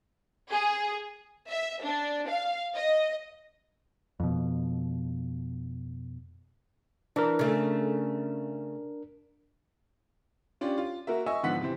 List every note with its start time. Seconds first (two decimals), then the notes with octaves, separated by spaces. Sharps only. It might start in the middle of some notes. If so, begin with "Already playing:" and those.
0.49 G#4
1.50 E5
1.83 D4
2.28 F5
2.75 D#5
4.20 F2 B2
7.16 E3 D4 A#4
7.39 C#3 A3
10.61 C#4 D4 F4 G4
10.78 F4
11.07 A#3 F#4 A#4 E5
11.26 D#5 E5 G#5 C#6 E6
11.43 G#2 D3 F3 B3 F#5 B6
11.61 C3 E3 C4